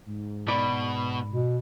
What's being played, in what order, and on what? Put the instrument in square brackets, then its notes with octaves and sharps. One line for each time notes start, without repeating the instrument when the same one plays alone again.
[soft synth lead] G#2
[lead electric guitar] B2 [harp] D5 B5 D7
[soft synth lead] G#2
[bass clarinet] B2